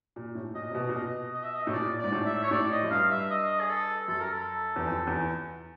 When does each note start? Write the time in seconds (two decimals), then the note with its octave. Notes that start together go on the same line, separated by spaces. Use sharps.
0.16 A#2
0.35 A2
0.55 A#2 D#5
0.71 C3
0.75 B2
0.89 A#2
0.95 B2 D#5
1.33 D#5
1.44 E5
1.54 D#5
1.67 A2
1.73 A#2 D5
1.99 G#2 D5
2.12 A2
2.26 E5
2.43 C#5
2.51 A2 D5
2.71 D#5
2.83 F#2
2.91 G2 F5
3.10 E5
3.30 D#5
3.60 G#4
3.69 A4
4.08 F#2 A4
4.20 A#4
4.33 A4
4.76 E2
4.87 F2
5.07 E2